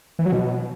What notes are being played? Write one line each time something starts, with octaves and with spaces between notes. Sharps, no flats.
E3
F#3
B2